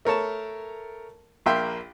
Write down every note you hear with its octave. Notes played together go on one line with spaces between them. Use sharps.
A3 A#4 C#5 A5
A#1 A#3 E5 G5 C6